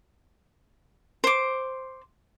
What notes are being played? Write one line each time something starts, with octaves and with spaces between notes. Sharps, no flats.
C5 D6